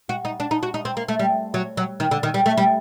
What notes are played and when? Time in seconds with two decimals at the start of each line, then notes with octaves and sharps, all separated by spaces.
0.09 F#4
0.25 D#4
0.40 D4
0.51 D#4
0.63 F#4
0.74 D#4
0.85 C4
0.97 A#3
1.08 A3
1.19 G3
1.54 F#3
1.77 F#3
2.00 D#3
2.11 D3
2.23 D#3
2.34 G3
2.46 A3
2.57 G3